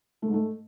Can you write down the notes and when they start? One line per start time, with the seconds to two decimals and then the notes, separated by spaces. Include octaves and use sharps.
0.22 A3
0.28 G#2
0.34 A3